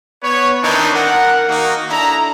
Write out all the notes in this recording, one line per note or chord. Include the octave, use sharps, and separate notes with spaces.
B3 B4 C#5
D#3 E3 C4 D4 D#4
A#4 F#5
D#3 A#3 D#4 F#4
D4 E4 A4 A#5